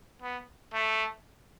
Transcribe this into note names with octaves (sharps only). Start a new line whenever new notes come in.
B3
A3